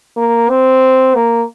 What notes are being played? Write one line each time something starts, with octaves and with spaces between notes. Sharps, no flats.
A#3
C4
A#3